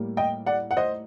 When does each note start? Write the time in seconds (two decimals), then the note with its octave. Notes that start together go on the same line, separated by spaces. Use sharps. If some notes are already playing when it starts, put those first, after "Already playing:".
Already playing: A2 G3 A#3
0.17 D#5 G5
0.46 D5 F#5
0.71 F#5
0.77 C5 D#5